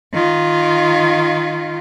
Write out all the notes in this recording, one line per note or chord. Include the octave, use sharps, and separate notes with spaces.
D#3 F4